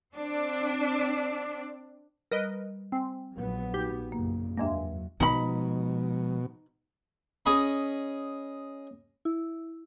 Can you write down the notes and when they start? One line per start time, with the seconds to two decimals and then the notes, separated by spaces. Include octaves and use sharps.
0.14 C4 D4
2.32 G3 A#4 B4 D#5
2.92 C4 G#5
3.36 A#1 F#3 B3
3.74 D#4 F#4 G4
4.12 F#2 A#2 C#3 A#3
4.57 E2 G2 F#3 G#3 A#3 E5
5.20 B2 F3 G#3 D#4 B5
7.46 C#4 G#4 D#5 B5
9.25 E4